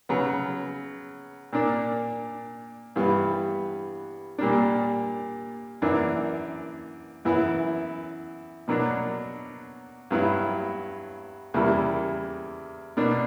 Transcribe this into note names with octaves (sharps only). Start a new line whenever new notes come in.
C#3 F#3 B3
A#2 A#3 D4
G2 E3 G3 B3
A#2 G3 A#3 D4
F#2 E3 A#3 D4
F#2 E3 B3 E4
B2 F#3 A#3 D4
G2 F#3 B3 E4
E2 C#3 G3 A#3 E4
B2 A#3 D4